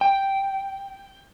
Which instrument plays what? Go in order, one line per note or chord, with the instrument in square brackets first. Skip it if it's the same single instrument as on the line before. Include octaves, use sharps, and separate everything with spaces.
[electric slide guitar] G5